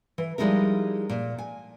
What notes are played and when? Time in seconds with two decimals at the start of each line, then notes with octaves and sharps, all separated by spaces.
0.18 E3
0.38 F3 G3 G#3 D#4 E4 A#4
1.09 A#2
1.38 G#5